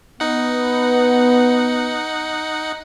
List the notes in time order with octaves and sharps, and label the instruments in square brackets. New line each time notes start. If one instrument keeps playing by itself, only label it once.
[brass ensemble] B3 [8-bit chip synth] D#4 F#5